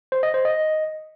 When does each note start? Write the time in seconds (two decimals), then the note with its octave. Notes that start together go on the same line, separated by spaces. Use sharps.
0.12 C5
0.23 D#5
0.34 C5
0.45 D#5